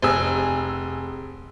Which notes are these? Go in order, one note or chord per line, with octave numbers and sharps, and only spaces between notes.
F1 G#4 E6